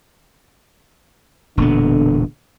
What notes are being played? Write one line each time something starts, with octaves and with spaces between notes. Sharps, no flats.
E1 A#2 D3 B3